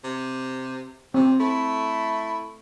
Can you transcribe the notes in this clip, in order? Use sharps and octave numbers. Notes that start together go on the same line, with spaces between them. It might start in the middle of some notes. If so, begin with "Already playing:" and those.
C3
C3 C4
A3 E4